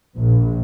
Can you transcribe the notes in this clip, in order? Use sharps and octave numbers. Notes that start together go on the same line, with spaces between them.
A#1